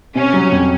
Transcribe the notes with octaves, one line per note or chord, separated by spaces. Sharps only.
C3 C#4
F#3
F2